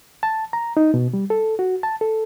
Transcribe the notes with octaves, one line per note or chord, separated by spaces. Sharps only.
A5
A#5
D#4
B2
G3
A4
F#4
A5
A4